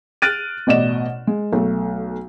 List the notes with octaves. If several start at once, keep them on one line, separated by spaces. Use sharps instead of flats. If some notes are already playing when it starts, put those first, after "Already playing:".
F6 F#6 A6 D7 D#7
A1 B2 D5 D#5 E7
G#3
B1 A3